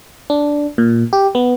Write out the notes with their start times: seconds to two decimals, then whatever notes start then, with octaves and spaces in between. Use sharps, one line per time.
0.30 D4
0.78 A#2
1.13 G4
1.35 B3